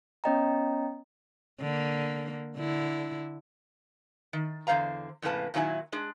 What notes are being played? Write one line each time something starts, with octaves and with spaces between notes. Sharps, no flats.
B3 C#4 C#5 D#5 G5 A#5
D3 A#3
D3 E4
D#3
E2 D3 G#3 C5 F5 A#5
F2 A2 C#3 A#3 B4 A5
A#2 D#3 F#3 D4 E4 G#5
G#3 D4 G#4